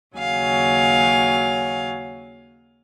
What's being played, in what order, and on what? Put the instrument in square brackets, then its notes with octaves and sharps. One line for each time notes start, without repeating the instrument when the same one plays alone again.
[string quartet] D#2 C#3 F#3 F5 G#5